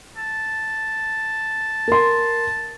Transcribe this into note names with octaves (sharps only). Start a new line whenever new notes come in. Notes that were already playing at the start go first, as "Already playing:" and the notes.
A5
A#4 C6